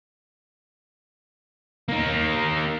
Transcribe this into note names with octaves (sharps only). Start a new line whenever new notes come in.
A#3 D#4